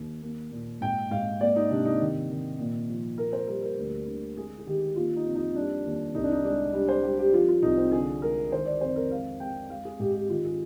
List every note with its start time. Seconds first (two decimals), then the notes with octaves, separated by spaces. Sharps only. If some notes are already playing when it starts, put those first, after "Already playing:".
Already playing: D#2
0.22 A#3
0.51 A#2
0.81 G#2 G5
1.11 G#2 F5
1.40 A#3 D5
1.56 D#4
1.70 C3 D4
1.85 D#4
1.99 D#3
2.30 D#3
2.59 A#2
2.89 F3
3.18 A#3 A#4
3.33 C5
3.48 G3 A#4
3.62 A#4
3.77 D2
4.07 D3
4.37 G#3 G#4
4.58 G#4
4.66 D#3 G4
4.96 A#3 F4
5.16 D#4
5.25 F2
5.35 D#4
5.55 G3 D4
5.86 D#2
6.15 C2 D#4
6.23 D4
6.32 D#4
6.45 G#3 D4
6.73 G3 D4
6.88 C5
7.03 G3 G4
7.19 G4
7.33 F3 F4
7.48 F4
7.62 C2 D#4
7.77 C4
7.92 D3 G#4
8.22 G#3 A#4
8.51 D#3 C5
8.66 D5
8.81 F2 C5
8.96 A#4
9.11 G#3 F5
9.40 G#3 G5
9.70 G#3 F5
9.85 G#4
9.99 G#2 G4
10.14 G4
10.29 D#3 F4
10.44 G#4